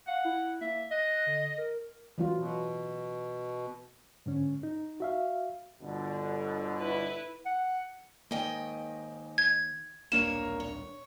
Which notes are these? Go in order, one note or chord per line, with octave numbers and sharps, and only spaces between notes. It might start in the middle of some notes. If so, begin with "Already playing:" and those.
F5 F#5
E4
A#3 E5
D#5 F#6
D3
A#4
E3 F#3 F4
B2
G#2 D3 C#4
D#4
F#4 E5 F5
G1 B2 D3
E4 B4
F#5
G#2 D#3 A#3 D#5 G5
G#6
D#1 B1 A#3 D4 A#4 C#5 E7
C#5